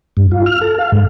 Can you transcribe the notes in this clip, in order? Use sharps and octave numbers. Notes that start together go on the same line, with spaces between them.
G2
F4
F6
A4
F5
G#2